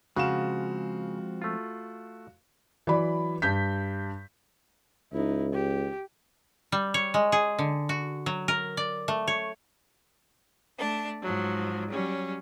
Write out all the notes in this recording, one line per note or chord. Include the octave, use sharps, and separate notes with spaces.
C#3 F3 G#3 C4 F#4 F5 E7
A3 F4
E3 F#3 D5 B5
G2 G6 B6
C#2 D#4 E4
G4
G3
C#5
G#3
G#4
D3
F#4
F#3
A#4
D5
A3
C#5
A3 D4 A5
G#2 F3 F#3
F#3 G3 C#4